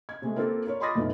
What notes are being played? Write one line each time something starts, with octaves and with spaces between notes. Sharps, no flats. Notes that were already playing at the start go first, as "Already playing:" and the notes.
G#6
C3 G#3 A3
A#3 C4 F4 G4 A4
F4 A#4 C#5
B5 C6 D6 D#6 A6 A#6
F#2 B2 A3 B3 D#4 F4